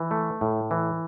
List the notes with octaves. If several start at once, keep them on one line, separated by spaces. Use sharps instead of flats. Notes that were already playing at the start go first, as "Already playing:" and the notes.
Already playing: E3
A3
A2
E3